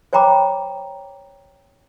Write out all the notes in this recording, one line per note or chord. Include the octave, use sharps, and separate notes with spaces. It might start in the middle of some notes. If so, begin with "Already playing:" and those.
C5 C#5 G5 A#5 B5 D6